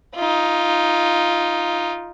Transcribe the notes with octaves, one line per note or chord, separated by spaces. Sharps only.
D#4 F4